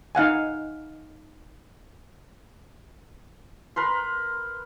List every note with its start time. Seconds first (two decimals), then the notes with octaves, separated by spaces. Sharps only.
0.15 D#4 F5 F#5 G#5
3.76 A#4 B4 C6